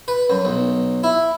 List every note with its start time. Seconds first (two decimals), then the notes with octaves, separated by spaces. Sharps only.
0.08 B4
0.30 F#2
0.45 B1
1.03 E4